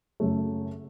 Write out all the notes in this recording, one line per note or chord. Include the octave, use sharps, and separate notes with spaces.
F#2 C#3 F#3 A3